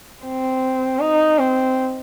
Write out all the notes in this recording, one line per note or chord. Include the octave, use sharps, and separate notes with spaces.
C4
D#4
C4